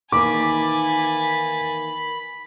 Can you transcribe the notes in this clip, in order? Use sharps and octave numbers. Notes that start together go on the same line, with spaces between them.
D#3 E3 A#3 G#5 B5 D6 A6